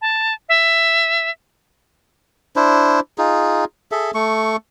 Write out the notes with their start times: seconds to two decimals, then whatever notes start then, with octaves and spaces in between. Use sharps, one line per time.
0.01 A5
0.49 E5
2.56 D4 E4 C5
3.18 D#4 F4 G#4
3.92 G#4 A4 E5
4.14 A3 C#6